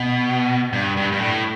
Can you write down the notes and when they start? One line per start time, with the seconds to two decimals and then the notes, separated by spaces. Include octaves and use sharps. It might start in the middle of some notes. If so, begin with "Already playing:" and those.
Already playing: B2
0.73 G2
0.97 G2
1.12 G2
1.19 A2